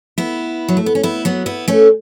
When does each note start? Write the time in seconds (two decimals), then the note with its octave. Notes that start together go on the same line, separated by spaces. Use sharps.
0.18 B3 E4
0.68 F#3
0.77 A3
0.86 B3
0.95 C#4
1.03 B3 E4
1.25 F#3 B3
1.46 B3 E4
1.68 A3 C#4